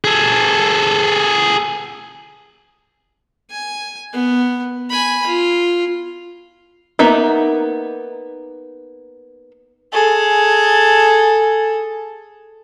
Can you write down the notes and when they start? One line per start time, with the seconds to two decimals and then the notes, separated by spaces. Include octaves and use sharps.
0.04 G#4 A4
3.50 G#5
4.13 B3
4.90 G#5 B5
5.27 F4
6.99 A#3 B3 D#4 E5 A#5
9.92 G#4 A4